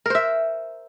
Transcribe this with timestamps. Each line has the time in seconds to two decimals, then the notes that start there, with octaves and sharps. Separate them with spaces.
0.06 A#4
0.10 C5
0.15 E5